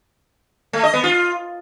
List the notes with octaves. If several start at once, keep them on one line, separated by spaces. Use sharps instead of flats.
A3
D#5
B3
F4